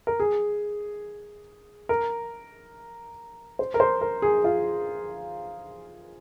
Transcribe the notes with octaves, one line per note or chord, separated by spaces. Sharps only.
A#4
G#4
A#4
C5
A#4
C5
A#4
G#4
F4